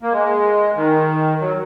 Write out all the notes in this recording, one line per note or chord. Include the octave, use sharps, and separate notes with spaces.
A#3
G#3
D#3
F#3